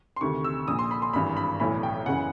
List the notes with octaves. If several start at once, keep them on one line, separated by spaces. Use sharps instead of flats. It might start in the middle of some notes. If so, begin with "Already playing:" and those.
C6
D2 C3 D#3 C#6
E6
A#1 A#2 D#6
C6
B5
C6
G#1 G2 E3 B5
B5
B1 A2 E3 B5
G5
F#1 C#3 E3 F#5